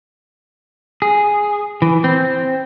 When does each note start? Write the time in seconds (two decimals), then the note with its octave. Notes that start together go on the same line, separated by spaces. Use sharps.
1.02 G#4
1.82 E3
2.04 C4